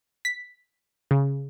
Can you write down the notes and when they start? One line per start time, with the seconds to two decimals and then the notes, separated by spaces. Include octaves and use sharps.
0.25 B6
1.11 C#3